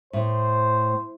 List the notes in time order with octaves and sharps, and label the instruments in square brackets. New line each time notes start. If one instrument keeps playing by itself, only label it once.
[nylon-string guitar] A2 [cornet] C5